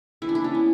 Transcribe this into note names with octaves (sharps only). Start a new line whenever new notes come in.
E3 E4
D4
E4
C#4
B3